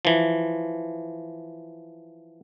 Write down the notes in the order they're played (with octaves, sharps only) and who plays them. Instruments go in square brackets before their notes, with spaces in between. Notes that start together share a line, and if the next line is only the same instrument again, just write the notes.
[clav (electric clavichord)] E3 F3